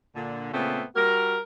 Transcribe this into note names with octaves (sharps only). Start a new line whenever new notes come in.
A#2 D3
A#2 C#3 A3 B3 C4
G3 F#4 A#4